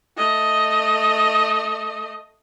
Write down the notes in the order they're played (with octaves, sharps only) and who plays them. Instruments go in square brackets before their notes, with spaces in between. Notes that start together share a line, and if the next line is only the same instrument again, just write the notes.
[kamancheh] A3 D#5